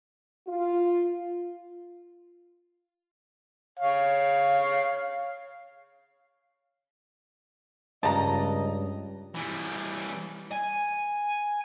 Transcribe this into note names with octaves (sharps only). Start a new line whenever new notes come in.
F4
C#5 F5
C#2 G2 D#5 A5 A#5
E3 G3
G#5